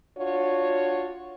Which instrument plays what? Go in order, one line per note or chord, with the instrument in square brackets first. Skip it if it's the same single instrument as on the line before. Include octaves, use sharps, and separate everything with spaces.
[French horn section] D4 F4 F#4 C#5